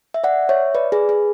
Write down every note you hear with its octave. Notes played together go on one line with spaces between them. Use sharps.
E5
D5 F#5
C#5 E5
B4 D5
G#4 B4
G#4